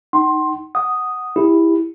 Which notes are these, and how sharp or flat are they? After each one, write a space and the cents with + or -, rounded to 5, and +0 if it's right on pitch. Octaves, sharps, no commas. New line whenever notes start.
D#4 +0 F#5 +45 C6 +15
F#5 +0 D#6 +0
E4 +0 G4 +30